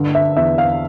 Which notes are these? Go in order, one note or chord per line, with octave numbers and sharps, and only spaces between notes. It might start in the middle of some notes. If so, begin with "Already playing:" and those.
Already playing: G2 D3
E5
E2 E5
F5